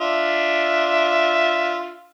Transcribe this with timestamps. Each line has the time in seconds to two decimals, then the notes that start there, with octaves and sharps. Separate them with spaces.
0.01 D4 F4 E5